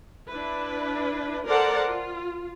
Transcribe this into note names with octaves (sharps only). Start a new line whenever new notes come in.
D4 E4 B4
A4 A#4 C5 D5 F#5 A5
F4